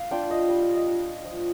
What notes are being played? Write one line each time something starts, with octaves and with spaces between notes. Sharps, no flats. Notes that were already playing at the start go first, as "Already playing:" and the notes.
Already playing: F5
D4 F4 G5
D#5
G3 D#5
F5
D#5
D4 F4
F3